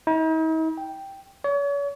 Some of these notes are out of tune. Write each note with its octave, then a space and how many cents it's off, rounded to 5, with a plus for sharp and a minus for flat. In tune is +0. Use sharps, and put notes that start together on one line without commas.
D#4 +45
G5 +0
C#5 +40